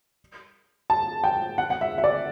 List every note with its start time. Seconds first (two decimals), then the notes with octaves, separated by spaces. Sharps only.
0.90 A5
1.24 G5
1.58 F#5
1.70 F#5
1.81 E5
1.98 E5
2.04 D5